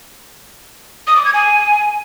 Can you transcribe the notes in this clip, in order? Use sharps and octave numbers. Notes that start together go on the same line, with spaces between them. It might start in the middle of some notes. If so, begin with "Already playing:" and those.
D#6
D6
G#6
G#5